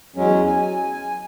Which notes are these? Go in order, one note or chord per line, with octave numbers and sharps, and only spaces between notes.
E2 F#3 G#3 C#4
G#5